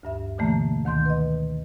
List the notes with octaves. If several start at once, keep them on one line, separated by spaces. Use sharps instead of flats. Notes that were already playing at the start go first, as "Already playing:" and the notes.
D2 G2 E5
B2 D3 E3 A3 A#3
D2 D#3 C6 G6
B4 D#5